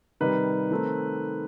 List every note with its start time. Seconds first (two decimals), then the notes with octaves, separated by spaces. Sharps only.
0.20 C3 D#3 G3 D#4 B4
0.71 D#3 A3 C4 D#4